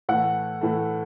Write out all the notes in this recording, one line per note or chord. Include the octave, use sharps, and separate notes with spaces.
A2 E3 A3 F#5
A2 E3 A3